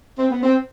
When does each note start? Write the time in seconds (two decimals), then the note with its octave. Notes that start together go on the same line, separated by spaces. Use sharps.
0.19 C4
0.31 B3
0.43 C4